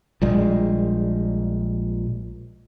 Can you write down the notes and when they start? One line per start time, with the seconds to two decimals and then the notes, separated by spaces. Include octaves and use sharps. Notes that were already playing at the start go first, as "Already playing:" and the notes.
0.21 A#1 A#2 G3 G#3